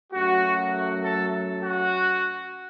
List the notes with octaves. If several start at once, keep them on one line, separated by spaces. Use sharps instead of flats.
F#2 F#3 A3 F#4
F#4
A4
F#4